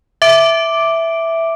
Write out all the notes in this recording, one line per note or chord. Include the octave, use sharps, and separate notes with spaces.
E5 D6 D7